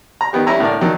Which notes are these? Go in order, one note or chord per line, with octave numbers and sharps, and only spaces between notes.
A#5
D#3 B3 G4
G3 C#4 E4 A#5 E6
A2 D3 A#4 D5
D#3 F#3 D4